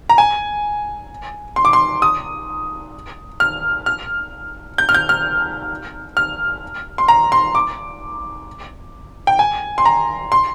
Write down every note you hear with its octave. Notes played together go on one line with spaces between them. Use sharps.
A#5
G#5
C6
D6
C6
D#6
F6
F6
G6
F6
G6
F6
F6
C6
A#5
C6
D6
G5
G#5
C6
A#5
C6